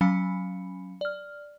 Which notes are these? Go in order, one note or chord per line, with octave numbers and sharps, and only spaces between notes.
F#3 C#4 F5 G#5 B5 C#7
D5 F6